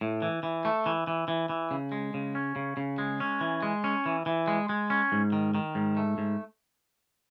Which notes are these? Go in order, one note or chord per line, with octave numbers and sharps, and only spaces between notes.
A2
E3
E3
A3
E3
E3
E3
E3
C#3
G#3
C#3
C#4
C#3
C#3
G#3
C#4
E3
G#3
C#4
E3
E3
G#3
G#3
C#4
G#2
D#3
D#3
G#2
A3
G#2